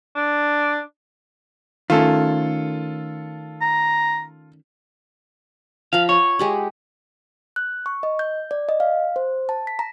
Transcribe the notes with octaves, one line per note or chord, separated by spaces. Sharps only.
D4
D#3 A3 C#4 F4 A4
A#5
F3 F5 A#5 B5
C#5 F#5
G#3 G4 F#5
F#6
C#6
D#5
G6
D5
D#5
F5
C5
A5
B6
A#5